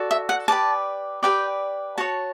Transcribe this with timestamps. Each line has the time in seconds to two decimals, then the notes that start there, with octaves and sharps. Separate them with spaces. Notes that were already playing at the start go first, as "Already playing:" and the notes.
Already playing: F#4 A4 D5
0.11 E5
0.29 F#5
0.48 G4 B4 D5 A5
1.23 G4 B4 D5 G5
1.98 F#4 C#5 A5